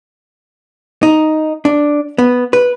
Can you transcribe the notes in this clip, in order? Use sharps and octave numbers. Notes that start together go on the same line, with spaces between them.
D#4
D4
B3
B4